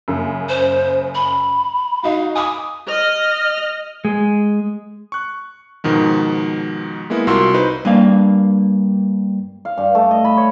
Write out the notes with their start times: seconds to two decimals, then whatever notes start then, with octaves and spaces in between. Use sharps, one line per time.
0.08 F#2 C#3 A#3
0.49 C5
1.15 B5
2.03 D#4 F#4 F5
2.35 G#5 B5 D6 D#6
2.88 D#5 F6
4.05 G#3
5.12 C#6 F#6
5.84 G#2 B2 D#3 F3
7.10 G#3 A#3 B3 E4
7.27 C2 F4 F#4 A#4 C6 E6
7.54 D#4 B4 C5
7.85 G2 A#3 F5
9.65 F5
9.78 G2
9.95 A3
10.11 D#5
10.25 B5
10.37 C#5